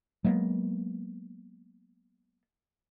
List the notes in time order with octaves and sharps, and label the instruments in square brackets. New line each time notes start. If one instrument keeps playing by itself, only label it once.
[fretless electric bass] F#3 G#3 A#3 B3